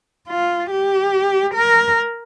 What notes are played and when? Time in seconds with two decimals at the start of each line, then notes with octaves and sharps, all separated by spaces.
0.29 F4
0.71 G4
1.55 A#4